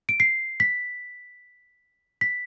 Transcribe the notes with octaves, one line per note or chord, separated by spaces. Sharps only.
D7
C7
B6
B6